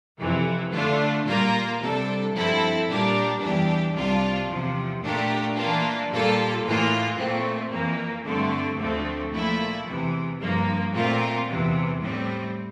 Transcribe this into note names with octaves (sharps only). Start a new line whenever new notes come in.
F2 C3 E3
D3 A3 D4 F4
A#2 G3 A#3 F4 A#4
C3 G3 D4 A4
G2 F3 C4 E4 A4
A#2 G3 D4 G4 A#4
E2 E3 G3 D4 G4
C2 C3 G3 D4 F4
E2 C3 F3
A#2 A3 D4 G4 A#4
E3 A#3 D4 F4
A#2 G3 A#3 F4 A4
A2 E3 A#3 F4
A#2 A3 C4
F2 E3 A#3
G2 D3 A3 C4
D2 D3 F3 A3 C4
A#2 F3 A3 E4
E2 C3 E3
G2 F3 A#3
A#2 A3 C4 F4 A#4
E2 C3 E3
A2 G3 C4